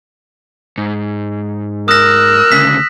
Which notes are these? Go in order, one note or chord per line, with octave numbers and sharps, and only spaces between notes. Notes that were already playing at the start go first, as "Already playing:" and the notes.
G#2
A#4 D#6 E6 F#6 A#6
D2 C#3 B6